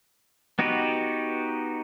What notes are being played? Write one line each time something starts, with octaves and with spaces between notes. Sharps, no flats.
B3 D#4 F#4 G4 B4